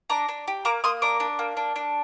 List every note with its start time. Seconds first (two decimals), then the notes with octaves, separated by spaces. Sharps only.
0.10 D4 A#5 D6
0.29 D4
0.48 G4
0.65 A#3 A#5 D6
0.84 A#3 C6 D#6
1.02 D4 A#5 D6
1.20 D4
1.39 A#3
1.57 D4
1.76 D4